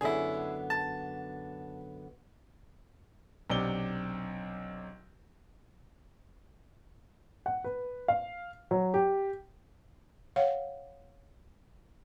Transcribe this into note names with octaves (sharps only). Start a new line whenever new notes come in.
F#2 D3 B3 E4 G#4
A5
B1 C3 D4 G7
F#5
B4
F5
F#3
G4
C#5 F5 F#5